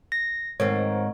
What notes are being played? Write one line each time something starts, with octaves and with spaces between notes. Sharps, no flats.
A#6
G#2 D#3 C4 C#5